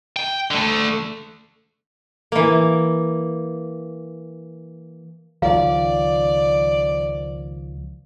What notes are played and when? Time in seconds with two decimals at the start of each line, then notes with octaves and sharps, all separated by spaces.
0.16 G5
0.51 D3 A3
2.32 E3 A#3
5.42 C#2 D#3 F3 D5 F5